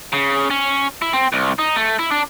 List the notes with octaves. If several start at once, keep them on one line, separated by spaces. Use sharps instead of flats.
C#3
C#4
E4
C4
C2
D#4
A3
E4
D4